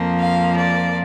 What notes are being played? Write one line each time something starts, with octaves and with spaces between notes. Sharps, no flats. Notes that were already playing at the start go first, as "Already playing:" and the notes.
Already playing: F2 F3 A#3
F5
D5